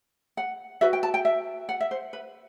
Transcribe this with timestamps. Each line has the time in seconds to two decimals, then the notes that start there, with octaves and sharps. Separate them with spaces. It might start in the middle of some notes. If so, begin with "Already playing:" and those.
0.37 F#5
0.81 F#4 B4 E5
0.93 G5
1.03 A5
1.14 G5
1.25 E5
1.69 F#5
1.81 E5
1.91 C5
2.13 B4